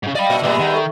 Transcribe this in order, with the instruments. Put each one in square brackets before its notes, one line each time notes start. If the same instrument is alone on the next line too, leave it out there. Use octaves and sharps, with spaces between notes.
[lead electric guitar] G#2 C#3
[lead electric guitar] D5 B5 [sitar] D#5 [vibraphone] F5 G5
[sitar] A#2 [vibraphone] E5 E6
[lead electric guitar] B2 A#3 [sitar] G3 G#3 B3
[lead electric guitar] D#3
[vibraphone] A4 E5 C#6